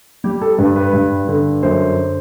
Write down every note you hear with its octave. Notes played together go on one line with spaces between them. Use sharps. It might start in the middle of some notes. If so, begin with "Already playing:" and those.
G3 G4
A4
G2 B4
B4
G2
D3
F#2 C5